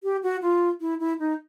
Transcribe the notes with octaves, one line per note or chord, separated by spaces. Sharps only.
G4
F#4
F4
E4
E4
D#4